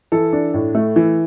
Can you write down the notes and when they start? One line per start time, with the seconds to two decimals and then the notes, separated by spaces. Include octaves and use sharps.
0.12 E3 A4
0.33 D4
0.54 A2
0.75 A3
0.96 E3